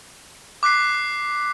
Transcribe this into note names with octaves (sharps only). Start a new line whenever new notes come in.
D6 F#6 B6 C7